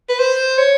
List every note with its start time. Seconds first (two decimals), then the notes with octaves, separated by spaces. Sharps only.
0.09 B4
0.20 C5
0.58 C#5